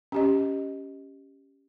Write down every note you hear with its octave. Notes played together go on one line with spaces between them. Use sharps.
C#4 G4 D#5